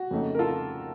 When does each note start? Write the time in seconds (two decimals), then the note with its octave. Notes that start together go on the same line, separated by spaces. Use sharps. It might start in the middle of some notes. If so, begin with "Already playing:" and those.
Already playing: F#4
0.11 F2 C#3 A3 D#4
0.35 A#4
0.39 F4 A4